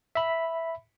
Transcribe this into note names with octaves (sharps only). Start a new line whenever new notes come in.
E5 B5